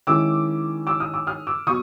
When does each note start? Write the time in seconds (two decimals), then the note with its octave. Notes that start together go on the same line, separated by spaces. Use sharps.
0.07 D#3 G#3 C#4 E4 D6 E6
0.87 D6 E6
1.00 D#6 F6
1.14 D6 E6
1.27 D#6 F6
1.47 D6 E6
1.67 B2 F#3 C#6 D#6